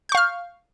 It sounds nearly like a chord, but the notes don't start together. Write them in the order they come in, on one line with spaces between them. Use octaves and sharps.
G6 C#6 F5 F6